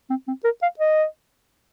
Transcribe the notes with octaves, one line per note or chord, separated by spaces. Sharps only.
C4
C4
A#4
F5
D#5